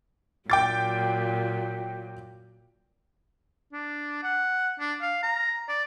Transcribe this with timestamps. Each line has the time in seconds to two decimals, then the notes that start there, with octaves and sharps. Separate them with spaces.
0.50 A#2 F#3 G5 D6 A6
3.72 D4
4.23 F#5
4.80 D4
5.01 F5
5.23 A#5
5.68 D5